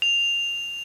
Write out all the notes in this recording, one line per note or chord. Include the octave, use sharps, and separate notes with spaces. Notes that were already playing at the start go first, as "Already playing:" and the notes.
F7